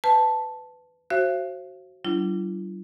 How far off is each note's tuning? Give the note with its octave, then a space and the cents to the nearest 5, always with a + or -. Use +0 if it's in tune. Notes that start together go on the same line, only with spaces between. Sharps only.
B4 +15 A5 +0
F#4 +10 C5 +30 F5 -45
F#3 +45 D4 +0 F4 -40